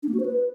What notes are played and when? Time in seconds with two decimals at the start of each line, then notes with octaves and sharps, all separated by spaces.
0.03 D4
0.09 A#3
0.14 F#4
0.20 C5
0.25 B4